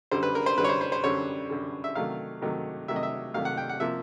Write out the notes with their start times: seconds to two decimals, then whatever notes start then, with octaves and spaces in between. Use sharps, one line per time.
0.11 F#2 D3 G3 C5
0.23 B4
0.35 A#4
0.46 C5
0.58 F#2 D3 G3 B4
0.64 C#5
0.69 C5
0.81 C5
0.92 C5
1.03 F#2 D3 G3 C#5
1.50 F#2 D3 G3
1.84 E5
1.95 C3 D#3 F#3 A3 F5
2.42 C3 D#3 F#3 A3
2.88 C3 D#3 F#3 A3 E5
2.96 D#5
3.03 E5
3.34 C3 D#3 F#3 A3 F5
3.45 F#5
3.57 G5
3.69 F#5
3.80 C3 F3 A#3 E5